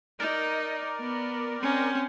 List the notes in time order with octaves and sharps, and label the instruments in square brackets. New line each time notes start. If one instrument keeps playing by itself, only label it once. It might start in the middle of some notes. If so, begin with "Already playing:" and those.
[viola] D#4 [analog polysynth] A#4 D5
[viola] B3
C4 C#4